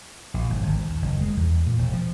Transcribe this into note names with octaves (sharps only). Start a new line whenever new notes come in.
A#1
G1
G#1
D#2
F#1
G#3
E2
A#2
E1
F3